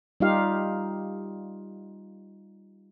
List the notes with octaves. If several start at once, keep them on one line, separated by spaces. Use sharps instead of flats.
G3 D#4 F4 G4 F5